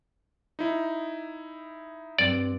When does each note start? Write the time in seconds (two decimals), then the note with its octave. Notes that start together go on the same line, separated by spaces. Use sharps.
0.59 D#4 E4
2.19 G2 C4 D5